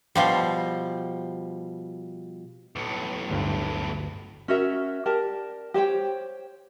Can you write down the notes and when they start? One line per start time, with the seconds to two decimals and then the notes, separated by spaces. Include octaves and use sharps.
0.15 B2 F3 G3
2.76 B1 A2
3.30 G1 D2 G2
4.48 C#4 F#4 A#4 E5
5.06 G4 A#4 D5 A5
5.74 G4 C5 C#5 G5